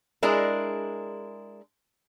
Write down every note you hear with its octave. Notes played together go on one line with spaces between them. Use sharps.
G#3 D4 E4 G#4 A#4